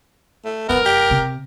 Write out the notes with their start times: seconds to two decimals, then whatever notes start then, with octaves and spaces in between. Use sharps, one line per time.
0.45 A3
0.69 F1 F#2 B3 A#4
0.86 G4
1.10 C3